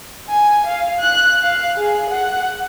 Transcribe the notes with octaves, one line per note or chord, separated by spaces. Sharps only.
G#5
F5
F#6
F5
G#4
F#5